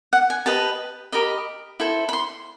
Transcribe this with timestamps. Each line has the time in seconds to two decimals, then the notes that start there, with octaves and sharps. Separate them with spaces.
0.13 F#5
0.30 G#5
0.46 G4 B4 D#5 A5
1.12 G4 A#4 D#5 B5
1.80 E4 A4 C5
2.09 B5
2.13 C6